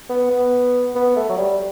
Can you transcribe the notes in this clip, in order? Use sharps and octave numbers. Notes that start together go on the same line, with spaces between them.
B3
B3
B3
A3
F#3
G3